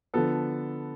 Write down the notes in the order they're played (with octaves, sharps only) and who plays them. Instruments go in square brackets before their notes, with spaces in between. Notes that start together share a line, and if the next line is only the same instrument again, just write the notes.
[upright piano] D3 F3 B3 A4